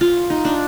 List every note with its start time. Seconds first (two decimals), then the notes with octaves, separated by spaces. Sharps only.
0.01 F4
0.30 D#4
0.45 D4